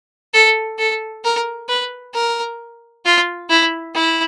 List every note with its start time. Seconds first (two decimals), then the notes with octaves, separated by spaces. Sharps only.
0.34 A4
0.79 A4
1.24 A#4
1.69 B4
2.14 A#4
3.05 F4
3.50 E4
3.95 E4